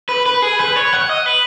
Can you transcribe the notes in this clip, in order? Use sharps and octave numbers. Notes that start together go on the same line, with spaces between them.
B4
B4
G#4
B4
C#5
F#5
D#5
B4